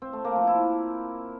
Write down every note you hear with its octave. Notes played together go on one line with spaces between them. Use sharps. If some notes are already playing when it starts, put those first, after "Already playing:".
C4
A3
A#3
F3
E4